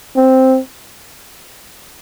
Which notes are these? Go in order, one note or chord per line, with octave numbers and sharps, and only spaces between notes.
C4